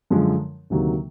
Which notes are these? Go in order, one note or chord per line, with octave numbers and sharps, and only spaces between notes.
F#2 D3 F3 G#3
D2 C3 D#3 F#3 A#3